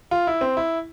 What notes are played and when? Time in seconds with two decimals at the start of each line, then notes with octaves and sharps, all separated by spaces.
0.11 F4
0.27 E4
0.41 C4
0.57 E4